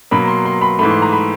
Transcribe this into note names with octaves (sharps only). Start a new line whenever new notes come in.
B2 F#3 A#3 B5
C6
C6
B5
G#2 E3 A3 B5
C6
A#5
B5